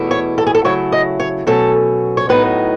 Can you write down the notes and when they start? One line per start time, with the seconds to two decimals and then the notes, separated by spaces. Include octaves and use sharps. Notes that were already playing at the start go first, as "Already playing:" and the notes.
Already playing: E2 B2 A3 E4
0.11 C#5
0.38 A4
0.47 G#4
0.55 A4
0.64 C#3 F#3 A3 E4 C#5
0.92 D#5
1.20 C#5
1.47 B2 F#3 A3 C#4 A4
2.17 C#5
2.29 A2 F#3 B3 D#4 B4